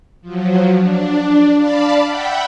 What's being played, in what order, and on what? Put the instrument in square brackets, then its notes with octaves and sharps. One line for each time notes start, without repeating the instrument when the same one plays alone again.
[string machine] F3 F#3
D4
D5 F5 A5 B5
E5 F#5 G5 B5